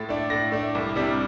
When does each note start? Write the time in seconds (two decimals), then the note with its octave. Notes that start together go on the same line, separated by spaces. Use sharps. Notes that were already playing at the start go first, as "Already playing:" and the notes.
Already playing: A2 A6
0.09 A3 D4
0.30 A2 A#6
0.52 A3 D4
0.75 C2
0.96 C3 G3 D4